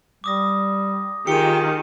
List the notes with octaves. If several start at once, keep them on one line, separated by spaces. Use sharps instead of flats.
G3 D6 D#6 A#6
D#3 F4 G4 G#4 C#7 D#7